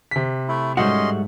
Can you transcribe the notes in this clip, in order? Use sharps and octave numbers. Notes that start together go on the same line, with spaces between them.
C3 B6
A3 E4
G#2 G3 A3 C#4 F#4 D#5 C6